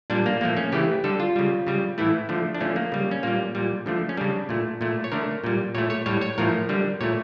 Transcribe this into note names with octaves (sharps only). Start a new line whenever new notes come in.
A#2 G3 D4
A#3
A#2 F3 A3 A#3
C#4
C#3 E3 A3 G4
D3 G3 A4
F4
C#3 G3
C#3 G3
A2 E3 A3 E4
D3 F3 A3
D4
D3 F3 A3 C#4
A#3
C#3 G3
C#4
A#2 G3 A#3
A#2 G3
D3 F3 A3
C#4
C#3 G3 D4
A#2 A3
A#2 A3
C#5
D3 A3 A#4
A#2 G3
A#2 A3 C#5
C#5
A2 G3 C#5
C#5
A2 F3 A3 A#4
D3 G3
A#2 A3 C#5